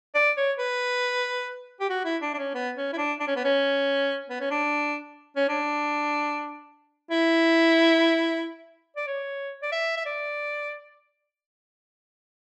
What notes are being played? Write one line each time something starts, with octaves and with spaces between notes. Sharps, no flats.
D5
C#5
B4
G4
F#4
E4
D4
D4
C#4
B3
C#4
E4
D4
D4
C#4
B3
C#4
B3
C#4
D4
C#4
D4
E4
D5
C#5
D5
E5
E5
D5